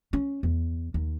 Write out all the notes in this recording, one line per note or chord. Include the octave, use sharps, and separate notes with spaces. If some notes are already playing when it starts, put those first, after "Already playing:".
C#4
E2
D#2